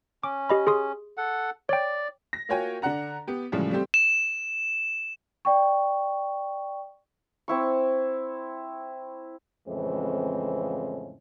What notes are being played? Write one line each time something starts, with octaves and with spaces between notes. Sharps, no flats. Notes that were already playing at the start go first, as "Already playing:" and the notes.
C#4 D6
G4 D#5 B5
G#4 C6 D#6
A4 F#5
C#5 D5 G5
A#6
A#3 F4 F#4 C#5 G5 G#5
D3 D4 F#5 A#5
B3 G4
A2 C#3 E3 F3 G3 G#3
G3 A3 C4 G4
E7
D5 G5 C#6
C4 E4 C#6
F2 A2 C#3 E3 G#3 C4